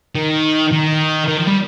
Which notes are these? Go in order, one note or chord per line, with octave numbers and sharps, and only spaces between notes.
D#3
D#3
D#3
F3
G3